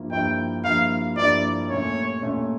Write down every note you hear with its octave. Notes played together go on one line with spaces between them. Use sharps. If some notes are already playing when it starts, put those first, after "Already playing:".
Already playing: G2 F3 A#3 E4
G2 F3 A#3 E4 G5
G2 F3 A#3 E4 F5
G2 F3 A#3 E4 D5
A#2 A3 C#4 C#5
A#2 A3 C#4